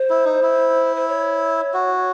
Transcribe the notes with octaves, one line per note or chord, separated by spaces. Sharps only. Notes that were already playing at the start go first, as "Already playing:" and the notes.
Already playing: C5
E4
D#4
E4
C5
C#5
F#4